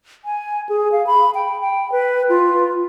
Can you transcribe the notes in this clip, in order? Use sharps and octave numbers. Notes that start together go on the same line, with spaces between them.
G#5
G#4
F5
B5
G5
G5
B4
F4